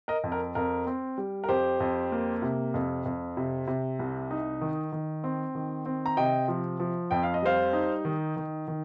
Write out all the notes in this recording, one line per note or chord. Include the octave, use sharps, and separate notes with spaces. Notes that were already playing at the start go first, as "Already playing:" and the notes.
A#4 D#5
F2
A#4
F2 A#4
C4
G3
A#4
F2 G4 C5
F2
A#3
C3
F2
F2
C3
C3
C2
D#4
D#3
D#3
C4
D#3
C4
A#5
C3 D#5 G5
F3
F3
F2 G5
F5
D#5
G3 C5 F5
D#4
D#3
D#3
D#3